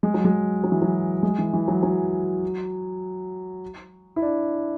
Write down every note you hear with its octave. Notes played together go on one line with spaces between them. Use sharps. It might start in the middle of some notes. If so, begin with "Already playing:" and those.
G#3
F#3
G#3
F#3
E3
F#3
G#3
E3
E3
F#3
F#3
E4
D4